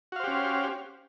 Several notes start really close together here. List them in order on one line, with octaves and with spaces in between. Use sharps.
F#4 F5 C5 G4 C#4